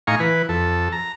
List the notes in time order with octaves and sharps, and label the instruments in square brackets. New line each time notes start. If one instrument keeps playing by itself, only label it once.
[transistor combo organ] A2 D#4 F5 G#5 A#5 C#6
E3 B4
F2 A4
A#5